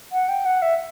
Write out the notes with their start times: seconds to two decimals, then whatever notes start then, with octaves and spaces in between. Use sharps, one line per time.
0.12 F#5
0.29 G5
0.46 F#5
0.62 E5